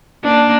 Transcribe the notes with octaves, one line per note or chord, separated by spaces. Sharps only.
A#3 D4